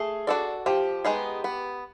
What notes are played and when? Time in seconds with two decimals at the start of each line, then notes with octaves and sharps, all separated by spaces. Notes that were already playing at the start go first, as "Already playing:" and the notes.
Already playing: A3 G#4
0.27 D4 F#4 A4 D5
0.66 F3 G4
1.05 G#3 B3 D#4 G#4
1.44 B3